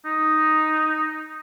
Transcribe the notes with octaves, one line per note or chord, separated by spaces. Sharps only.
D#4